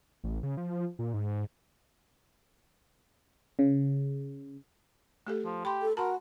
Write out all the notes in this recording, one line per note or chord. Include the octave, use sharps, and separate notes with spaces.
A1
C#3
F3
A#2
G#2
C#3
A3 G4 A4
F3
G4 B5 C6
A4
F#4 A#4 A5 B5 C6